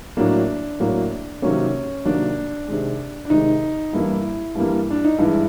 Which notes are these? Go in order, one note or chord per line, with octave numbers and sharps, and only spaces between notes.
A2 F#3 A#3 D4
A2 F#3 A#3
C3 D#3 F#3 A#3 C#4
C3 D#3 F#3 A#3 D4
C3 D#3 G#3
D4
C3 D#3 G#3 D#4
G2 E3 G3 A#3 E4
G2 E3 G3 A#3
D4
D#4
G2 E3 G#3 E4